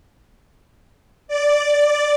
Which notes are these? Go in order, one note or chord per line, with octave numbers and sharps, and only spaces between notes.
D5